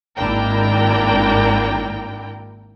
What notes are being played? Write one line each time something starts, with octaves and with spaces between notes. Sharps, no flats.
G#1 A#3 D4 E4 A#4 G5